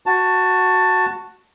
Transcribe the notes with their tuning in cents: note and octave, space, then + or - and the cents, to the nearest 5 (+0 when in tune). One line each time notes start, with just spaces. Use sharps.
F#4 +0 A5 +15